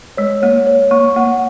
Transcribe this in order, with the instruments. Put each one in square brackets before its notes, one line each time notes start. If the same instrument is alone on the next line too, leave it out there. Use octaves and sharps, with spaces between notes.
[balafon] G#3 [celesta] C#5
[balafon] A#3 [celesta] C#5
[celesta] C#5
[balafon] A#3 [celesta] C#6
[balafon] A#3 [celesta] F#5